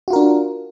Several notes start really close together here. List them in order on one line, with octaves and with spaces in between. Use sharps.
F#4 F4 A#4 D4